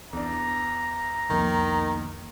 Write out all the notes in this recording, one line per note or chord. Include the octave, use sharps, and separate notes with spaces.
E2 D4 A#5
C2 F2 D#3 A#3